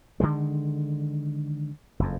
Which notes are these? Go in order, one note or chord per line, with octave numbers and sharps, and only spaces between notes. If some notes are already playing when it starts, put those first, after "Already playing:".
D3 D#3 G#3
F#1 F2